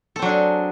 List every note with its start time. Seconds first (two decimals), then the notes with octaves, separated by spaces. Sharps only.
0.16 A4
0.19 C4
0.22 F#3
0.25 D4
0.28 G#4